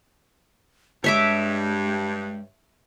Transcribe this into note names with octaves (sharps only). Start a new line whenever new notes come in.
G2 G#3 C#5 E5 D6